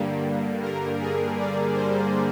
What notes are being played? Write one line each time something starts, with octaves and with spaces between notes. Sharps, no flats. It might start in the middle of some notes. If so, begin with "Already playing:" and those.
Already playing: G2 D3 G3 A#3
A#4
G#4
D5
C5